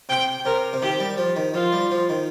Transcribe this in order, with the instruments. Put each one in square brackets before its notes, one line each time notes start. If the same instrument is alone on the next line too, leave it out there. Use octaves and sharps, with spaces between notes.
[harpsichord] C3 [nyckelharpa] G5
[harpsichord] C3 [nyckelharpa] A#4
[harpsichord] C3
[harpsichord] D#3 [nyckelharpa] G4
[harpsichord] G3
F3
D#3
[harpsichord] F3 [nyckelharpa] F4
[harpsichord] G3
F3
D#3